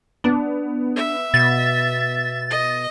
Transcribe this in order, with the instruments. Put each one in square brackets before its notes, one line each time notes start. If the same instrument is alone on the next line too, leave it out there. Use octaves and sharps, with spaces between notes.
[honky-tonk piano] B3 [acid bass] D4
[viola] E5
[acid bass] B2 [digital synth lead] A6
[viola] D#5